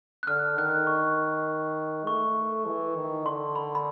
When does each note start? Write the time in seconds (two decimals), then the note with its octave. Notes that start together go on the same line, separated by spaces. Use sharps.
0.23 F#6
0.27 D3 F6
0.58 D#3 F#6
0.87 C#6
2.07 A3 C#6
2.66 E3
2.96 D#3
3.26 D3 C6
3.56 B5
3.75 B5